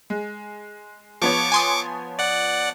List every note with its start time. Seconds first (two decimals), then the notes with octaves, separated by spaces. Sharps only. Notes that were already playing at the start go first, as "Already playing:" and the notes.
0.10 G#3
1.22 F3 B3 C#5 C#6 D6
1.52 G#5 C6 D#6
2.19 D5 F#5